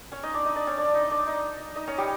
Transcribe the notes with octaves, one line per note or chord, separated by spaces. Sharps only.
C#4 C#5
D#4 D#5
D4 D5
D#4 D#5
D4 D5
C#4 C#5
D4 D5
D#4 D#5
D4 D5
D#4 D#5
D#4 D#5
C#4 C#5
G3 G4